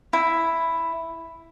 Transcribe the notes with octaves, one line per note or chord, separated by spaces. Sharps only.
E4